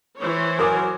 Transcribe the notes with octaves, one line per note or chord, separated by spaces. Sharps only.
E3 C5 C#5
F#3 A#4 G#5 D6 D#6